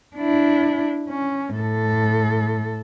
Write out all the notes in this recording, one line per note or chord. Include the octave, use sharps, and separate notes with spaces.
D4 E4
C#4
A2 A4